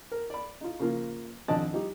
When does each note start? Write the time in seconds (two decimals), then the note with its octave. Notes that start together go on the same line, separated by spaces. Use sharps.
0.11 A#4
0.30 D5 B5
0.61 D#4 F4
0.79 C#3 F3 A#3 F4
1.48 G#1 F2 D4 D5 D#5 A5
1.73 F3 G3 D#4 G4